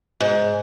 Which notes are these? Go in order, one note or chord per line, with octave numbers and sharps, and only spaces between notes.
G#2